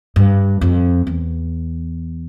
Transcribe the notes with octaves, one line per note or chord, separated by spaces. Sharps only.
G2
F2
E2